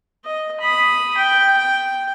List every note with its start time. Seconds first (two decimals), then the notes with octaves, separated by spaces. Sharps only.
0.25 D#5
0.60 B5 D#6
1.17 G5
1.58 G5